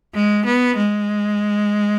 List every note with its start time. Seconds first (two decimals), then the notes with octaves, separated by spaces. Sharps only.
0.15 G#3
0.46 B3
0.77 G#3